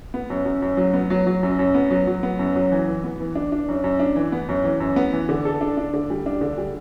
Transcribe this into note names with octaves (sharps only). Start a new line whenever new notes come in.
B3
F#2
F#2
F#2
F#3
B3
F#3
F#3
F#2
F#2
B3
F#3
F#3
B3
F#2
F#3
E3
E3
B3
E3
D4
D4
F#2
F#2
D4
E3
B3
F#2
E3
F#2
B3
E3
D3
A4
D4
D4
D3
G3
D4
D3
G3